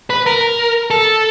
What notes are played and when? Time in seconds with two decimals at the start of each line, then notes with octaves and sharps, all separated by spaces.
0.10 B4
0.26 A#4
0.91 A4